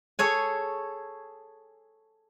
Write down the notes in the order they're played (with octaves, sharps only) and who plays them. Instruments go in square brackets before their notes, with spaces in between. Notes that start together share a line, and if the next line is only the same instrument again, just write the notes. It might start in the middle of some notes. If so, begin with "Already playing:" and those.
[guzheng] G#4 A4 C#5 G#5